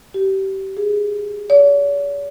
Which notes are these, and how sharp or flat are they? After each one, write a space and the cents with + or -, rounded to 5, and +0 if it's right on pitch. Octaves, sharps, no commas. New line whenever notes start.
G4 -25
G#4 -10
C#5 +45